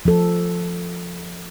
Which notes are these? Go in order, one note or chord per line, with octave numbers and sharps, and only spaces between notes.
F3 A4